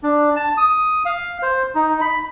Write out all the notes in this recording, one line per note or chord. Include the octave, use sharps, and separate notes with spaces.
D4
A5
D#6
F5
C5
D#4
B5